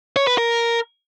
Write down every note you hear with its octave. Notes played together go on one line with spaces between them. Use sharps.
C#5
B4
A#4